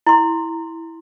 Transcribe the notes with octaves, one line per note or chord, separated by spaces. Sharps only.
E4 C6